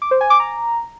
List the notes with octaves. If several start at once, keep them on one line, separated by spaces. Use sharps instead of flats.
D6
C5
G#5
D6
A#5